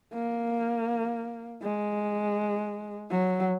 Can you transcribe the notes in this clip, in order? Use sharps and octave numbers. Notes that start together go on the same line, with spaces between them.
A#3
G#3
F#3